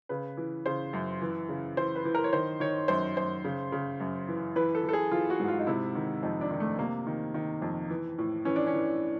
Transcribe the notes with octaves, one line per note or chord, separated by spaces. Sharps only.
C#3 B4
E3
C#3 C5
F#2
E3
C#3
E3 C5
B4
E3
A#4
C#5
D#3 C5
D#3 C#5
F#2 C5
F#2 C5
C#3
C#3
F#2
E3
E3 B4
A4
E3
A4
G#4
E3 F4
F#4
G#2
F4
D#4
C3 E4
D#3
F2 D#4
D4
D#3
A3
C3 A#3
D#3
D#3
F2
E3
A2
E3 C#4
D4
C#4
E3